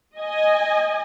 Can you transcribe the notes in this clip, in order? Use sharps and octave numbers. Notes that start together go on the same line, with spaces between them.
D#5 G#5